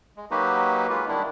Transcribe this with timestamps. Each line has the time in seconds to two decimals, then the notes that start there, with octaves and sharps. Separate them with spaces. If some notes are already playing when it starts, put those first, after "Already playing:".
0.17 G#3
0.31 F#3 A#3 D#4 F#4 G4 B4
0.90 G#3 F4 B4
1.08 D#3 G3 D4 E4